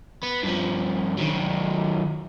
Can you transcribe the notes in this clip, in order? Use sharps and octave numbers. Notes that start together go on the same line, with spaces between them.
B3
G2 F3
D#3 F#3